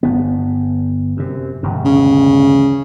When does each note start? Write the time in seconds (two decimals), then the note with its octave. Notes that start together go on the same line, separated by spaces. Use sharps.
0.03 G1 B3
1.17 F#2 C3
1.63 E1 D2 G2
1.85 C#3